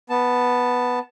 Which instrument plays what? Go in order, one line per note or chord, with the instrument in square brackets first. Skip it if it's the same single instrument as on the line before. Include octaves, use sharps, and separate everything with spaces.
[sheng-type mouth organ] B3 A5